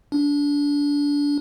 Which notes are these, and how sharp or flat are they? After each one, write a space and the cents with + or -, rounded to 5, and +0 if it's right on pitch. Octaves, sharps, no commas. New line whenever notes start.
D4 -25